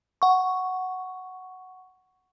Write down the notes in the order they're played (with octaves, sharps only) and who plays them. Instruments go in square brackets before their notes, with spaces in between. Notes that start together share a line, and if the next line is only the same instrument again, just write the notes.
[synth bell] F#5 C#6